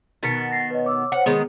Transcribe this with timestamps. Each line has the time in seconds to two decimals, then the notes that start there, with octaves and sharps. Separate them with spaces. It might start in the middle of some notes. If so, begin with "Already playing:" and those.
0.23 B2 D#3 B3 A6 B6 C#7
0.50 A6 A#6 C7
0.71 B4 C#5 D#5
0.84 C#5 D6 E6
1.12 C5 C#5 F#5 C#7
1.26 D#3 G#3 B3 G#4